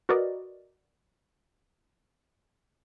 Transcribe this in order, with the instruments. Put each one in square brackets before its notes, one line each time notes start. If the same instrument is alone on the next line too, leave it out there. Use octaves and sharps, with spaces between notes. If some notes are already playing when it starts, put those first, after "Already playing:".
[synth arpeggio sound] F#4 A#4 B4 D5 D#5